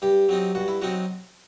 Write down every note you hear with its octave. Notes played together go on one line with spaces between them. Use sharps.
G2 G4
F#3 C4 D#4
G2 F#4
E4
F#3 C4 D#4 F#4